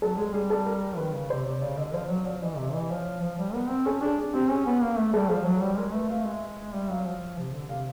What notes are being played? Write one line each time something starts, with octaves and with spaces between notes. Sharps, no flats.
F#3 A4
G#3 G#4
G3 G#4
A4
A#4
D#3 B4
C#3
C3 C5
C3 C#5
C#3 D5
D3 D#5
F3 C5
F#3 C#5
F3 D5
E3 D#5
C3 E5
E3 D#5
F3 C#5
F3
G3
B3 A#4
C4
C#4 A4
D4 G#4
G#4
C4 G4
C#4 G#4
B3
A#3
A3
G3 A4
F3 A4
F#3
G3
G#3 A#4
A3 B4
A3 F5
G#3 E5
G3 E5
F#3 F5
F3
C3
D3
C3 F5